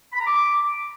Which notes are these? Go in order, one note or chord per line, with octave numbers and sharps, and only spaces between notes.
B5
A#5
D6